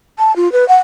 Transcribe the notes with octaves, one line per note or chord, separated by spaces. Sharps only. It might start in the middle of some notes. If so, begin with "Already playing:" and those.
A5
F4
B4
F#5